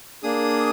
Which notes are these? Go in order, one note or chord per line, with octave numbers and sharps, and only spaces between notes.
A#3 D4 G#4 D#6